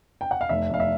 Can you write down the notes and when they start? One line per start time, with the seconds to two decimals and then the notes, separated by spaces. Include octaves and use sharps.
0.21 G5
0.31 F#5
0.41 F5
0.49 F1 E5
0.70 F1 F5
0.80 E5